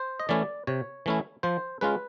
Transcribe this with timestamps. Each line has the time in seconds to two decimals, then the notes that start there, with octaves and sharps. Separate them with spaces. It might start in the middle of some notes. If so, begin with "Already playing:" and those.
Already playing: C5
0.20 D#5
0.29 E3 A3 C#4 E4 D5
0.67 C3 C#5
1.06 E3 A3 C#4 E4
1.43 F3 C5
1.81 G#3 C#4 F4 B4